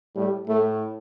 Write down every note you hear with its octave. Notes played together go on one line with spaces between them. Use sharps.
A2 G3
A2 A3